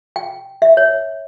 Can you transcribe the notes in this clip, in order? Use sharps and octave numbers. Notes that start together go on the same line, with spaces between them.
G5
E5
C#5